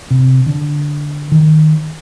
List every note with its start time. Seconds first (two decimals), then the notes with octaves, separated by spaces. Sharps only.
0.11 C3
0.46 D3
1.32 D#3